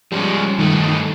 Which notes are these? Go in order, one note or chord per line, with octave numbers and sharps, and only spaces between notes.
F3 G3 G#3 C#4
G2 D#3 A3 D#4